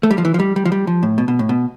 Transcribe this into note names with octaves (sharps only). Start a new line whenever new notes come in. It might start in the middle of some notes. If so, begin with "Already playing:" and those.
A3
G3
F3
E3
F3
G3
G3
F3
G3
F3
A2
B2
B2
A2
B2